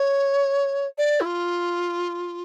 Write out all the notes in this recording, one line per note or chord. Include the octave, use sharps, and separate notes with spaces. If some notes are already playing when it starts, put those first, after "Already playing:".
Already playing: C#5
D5
E4
F4